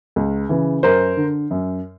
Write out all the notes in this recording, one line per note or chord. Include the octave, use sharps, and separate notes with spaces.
C#2
C#3 E3
F#2 A#4 C5
D3
F#2